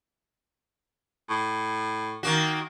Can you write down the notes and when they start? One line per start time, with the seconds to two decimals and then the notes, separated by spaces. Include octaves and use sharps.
1.29 A2
2.23 D#3 A#3 F#4